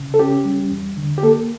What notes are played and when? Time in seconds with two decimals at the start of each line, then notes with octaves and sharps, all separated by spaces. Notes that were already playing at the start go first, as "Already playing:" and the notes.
Already playing: C#3
0.14 A4
0.19 C#4 G4
0.45 G3
0.71 E2
0.97 D3
1.18 G4
1.23 A#3 A4